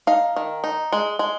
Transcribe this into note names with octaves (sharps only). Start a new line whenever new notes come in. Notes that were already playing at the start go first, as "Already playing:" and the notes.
D#4 F5
D#3
D#4
G#3
G#3